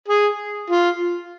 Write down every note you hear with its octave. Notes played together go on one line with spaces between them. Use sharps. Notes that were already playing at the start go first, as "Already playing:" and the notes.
G#4
F4